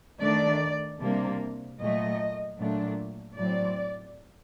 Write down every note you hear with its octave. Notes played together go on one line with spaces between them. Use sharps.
D#3 A3 D4 D5
C3 G3 A#3 D4
A#2 F#3 A3 D#5
A#2 F#3 A3 D4
A2 F#3 C4 D5